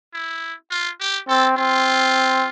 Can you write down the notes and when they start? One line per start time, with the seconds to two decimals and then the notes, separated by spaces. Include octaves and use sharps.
0.13 E4
0.71 F4
1.00 G4
1.28 C4 A4
1.57 C4 F4